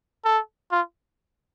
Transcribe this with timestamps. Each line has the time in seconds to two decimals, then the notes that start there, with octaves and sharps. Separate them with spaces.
0.25 A4
0.72 F4